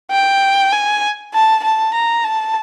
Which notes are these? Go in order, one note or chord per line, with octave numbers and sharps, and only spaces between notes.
G5
G#5
A5
A5
A#5
A5